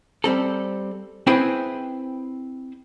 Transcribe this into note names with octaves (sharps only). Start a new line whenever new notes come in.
G3 C4 A4
C4 E4 G#4 B4 C5 G5